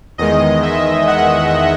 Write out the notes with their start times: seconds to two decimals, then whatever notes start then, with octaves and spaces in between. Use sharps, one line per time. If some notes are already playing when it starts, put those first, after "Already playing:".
0.18 E2 D#3 G#3 D#5
0.63 E5
1.07 F#5